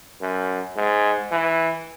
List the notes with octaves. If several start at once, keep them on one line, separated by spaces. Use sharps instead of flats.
F#2
G#2
E3